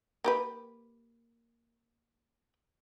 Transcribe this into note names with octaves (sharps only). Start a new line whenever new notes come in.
A#3 G4 B4